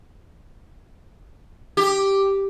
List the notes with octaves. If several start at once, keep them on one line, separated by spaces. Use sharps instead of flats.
G4